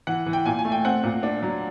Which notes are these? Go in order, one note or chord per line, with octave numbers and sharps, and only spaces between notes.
E3 F#5
E3
G5
A#2 G#5
G#5
A3
G5
C4 F#5
A#2
D4
F#3